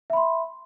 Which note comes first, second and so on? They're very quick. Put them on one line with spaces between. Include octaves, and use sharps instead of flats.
E5 B5 C6